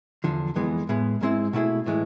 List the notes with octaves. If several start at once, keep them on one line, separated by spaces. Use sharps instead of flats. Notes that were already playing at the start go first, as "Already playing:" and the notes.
E2 D3 F3
F2 E3 G#3 B3
A2 G#3 B3
G#2 G#3 C4 E4
B2 A3 E4 G#4
A2 E3 G#3